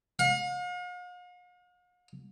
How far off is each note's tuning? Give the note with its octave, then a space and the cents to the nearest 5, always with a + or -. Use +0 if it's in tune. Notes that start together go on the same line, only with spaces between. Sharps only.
F5 +45